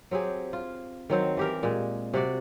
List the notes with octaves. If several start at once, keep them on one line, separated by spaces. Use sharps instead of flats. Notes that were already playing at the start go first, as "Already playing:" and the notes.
F#3 C4 G4 G#4
F4
D#3 F#3 C4 C5
E3 G4 A#4
A#2 G#3
C3 F#4 D5